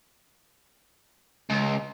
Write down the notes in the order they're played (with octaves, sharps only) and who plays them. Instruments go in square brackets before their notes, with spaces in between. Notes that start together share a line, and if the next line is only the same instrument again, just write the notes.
[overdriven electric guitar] C#2